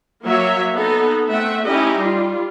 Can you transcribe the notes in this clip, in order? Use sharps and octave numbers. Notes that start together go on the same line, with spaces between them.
F#3 A#3 C#5 E5
B3 D#4 A4
A3 C4 E5 F#5
C#4 D#4 E4 G4 D#5
G3 F4